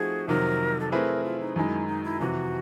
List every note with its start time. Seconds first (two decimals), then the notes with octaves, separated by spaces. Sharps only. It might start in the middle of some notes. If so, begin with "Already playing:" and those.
Already playing: F3 A3 C4 D#4 F#4 G#4
0.28 F2 C3 D#3 F#3 A#4
0.80 A4
0.92 A3 C4 E4 G#4 A#4 B4
1.24 F4
1.40 D#4
1.56 F#2 D#3 G#3 E4
1.88 D#4
2.04 E4
2.20 F2 C3 E3 F#4